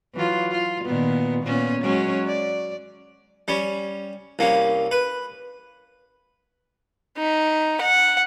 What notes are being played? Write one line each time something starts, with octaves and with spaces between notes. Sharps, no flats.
E3 F#3 F4
F4
A#2 D#3 B3
A#2 B3 C#4
F#3 G#3 C#4
D5
G3 C#4
C2 A#3 C#4
B4
D#4
F#5